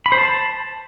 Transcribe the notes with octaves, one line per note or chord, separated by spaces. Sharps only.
B5
C5
A5